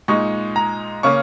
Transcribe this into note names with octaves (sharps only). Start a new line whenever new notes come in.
A#2 G#3 D#4 C#6
A#5
C#3 A#3 C#4 C#6